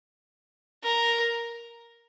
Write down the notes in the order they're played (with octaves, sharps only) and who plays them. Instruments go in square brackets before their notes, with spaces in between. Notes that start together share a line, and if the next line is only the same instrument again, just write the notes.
[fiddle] A#4